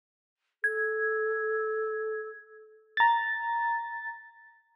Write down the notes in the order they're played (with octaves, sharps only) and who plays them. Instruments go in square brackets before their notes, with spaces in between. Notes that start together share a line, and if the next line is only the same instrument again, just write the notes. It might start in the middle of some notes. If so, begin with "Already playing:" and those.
[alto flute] A4 [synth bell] G#6
[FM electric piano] A#5 A6